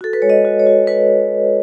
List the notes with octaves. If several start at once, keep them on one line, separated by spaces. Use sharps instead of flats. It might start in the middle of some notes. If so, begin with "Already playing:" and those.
F#4 A4
B4
G#3 C#5
D#5
F#4
C#5
F#4
F#4 B4